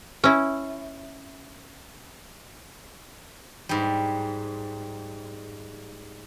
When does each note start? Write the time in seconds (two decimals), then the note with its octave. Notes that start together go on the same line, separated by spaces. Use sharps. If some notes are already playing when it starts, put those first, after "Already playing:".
0.24 C#4 E4
3.69 G#2 G3